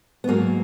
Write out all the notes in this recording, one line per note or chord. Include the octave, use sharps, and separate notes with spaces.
B3
G#2 F#3 A#3